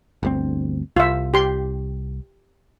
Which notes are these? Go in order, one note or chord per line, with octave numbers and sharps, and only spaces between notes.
G1 D2 C4
C2 F4 E5
G4 C6